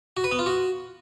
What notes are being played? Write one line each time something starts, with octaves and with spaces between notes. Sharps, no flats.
F#4
B4
B3
F4
F#4